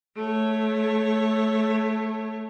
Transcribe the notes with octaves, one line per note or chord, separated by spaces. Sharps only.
A3 C#5